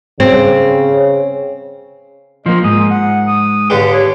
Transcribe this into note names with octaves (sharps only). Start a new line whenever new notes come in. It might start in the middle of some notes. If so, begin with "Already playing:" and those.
C#3 C4
F3 A#3 D#5
G#2 D#6
F#5
D#6
D#2 D3 G4 B4
C#5